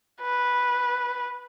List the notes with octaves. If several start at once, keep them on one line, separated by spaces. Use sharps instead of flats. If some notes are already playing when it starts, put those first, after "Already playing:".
B4